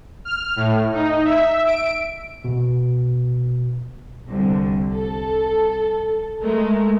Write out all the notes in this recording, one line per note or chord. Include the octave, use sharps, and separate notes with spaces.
F6
A2
D#4
E5
D7
B2
C2 D3
A4
G#3 A3 A#4